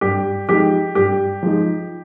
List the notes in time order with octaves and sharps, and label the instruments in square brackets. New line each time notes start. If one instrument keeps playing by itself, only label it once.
[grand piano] G2 [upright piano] G4
[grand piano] F3 G#3 D#4 [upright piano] G4
[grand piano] G2 [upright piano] G4
[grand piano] F3 G#3 D#4